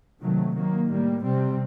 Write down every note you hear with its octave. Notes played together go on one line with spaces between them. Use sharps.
C3 D#3 F#3 A3
D#3 F#3 A#3
A2 G3 A#3
C3 G3 C4